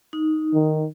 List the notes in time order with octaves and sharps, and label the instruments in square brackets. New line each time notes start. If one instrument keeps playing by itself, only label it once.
[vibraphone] D#4
[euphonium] D#3